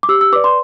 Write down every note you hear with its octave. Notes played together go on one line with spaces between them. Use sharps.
D6
G4 E6
E6
B4 D5 D6
C6